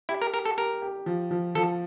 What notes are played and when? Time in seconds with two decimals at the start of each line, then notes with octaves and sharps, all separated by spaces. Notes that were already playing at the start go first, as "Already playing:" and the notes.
0.09 E4 G4
0.22 A#4
0.34 G4 A#4
0.45 A4
0.57 G4 A#4
0.82 G4
1.06 F3
1.31 F3
1.55 F3 A4